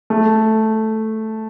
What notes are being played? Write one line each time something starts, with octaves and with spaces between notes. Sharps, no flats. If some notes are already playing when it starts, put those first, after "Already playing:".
A3